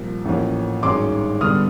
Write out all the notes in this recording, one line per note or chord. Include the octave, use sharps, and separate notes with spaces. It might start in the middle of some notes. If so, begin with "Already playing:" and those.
Already playing: C2 A#2 F3 A#3
A1 A2 F3 A#3 C#4
G#1 G2 D#3 G#3 C#4 C6 D6
G2 D3 G3 B3 D4 D#6 F6